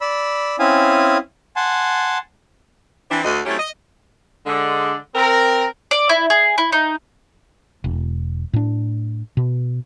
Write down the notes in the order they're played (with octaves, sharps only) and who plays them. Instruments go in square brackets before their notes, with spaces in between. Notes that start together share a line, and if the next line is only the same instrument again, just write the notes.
[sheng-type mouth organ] D5 B5 E6
C4 C#4 E4 F5 G#5 D#6
F#5 G#5 A5 C6
[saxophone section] E3 C4 D4
D2 D#5
F#3 A3 C4 C#4 E4 G4
D#5
[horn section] D3 G#3 D5
C4 A#4
[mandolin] D5
E4
G#4
E4
D#4
[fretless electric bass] E1
A2 D4
B2